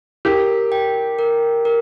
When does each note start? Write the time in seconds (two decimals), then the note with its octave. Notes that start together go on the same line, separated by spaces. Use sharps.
0.25 G4 A#4
0.72 G5
1.19 A#4
1.65 A#4